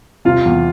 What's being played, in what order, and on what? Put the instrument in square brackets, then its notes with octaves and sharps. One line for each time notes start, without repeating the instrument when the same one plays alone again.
[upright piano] C3 [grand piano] F4
[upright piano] E2